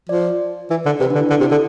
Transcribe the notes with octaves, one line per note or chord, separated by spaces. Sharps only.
F3 D5
E3
D3
C3 B4
D4
D3
E4
D3
C3 E4
D3 A4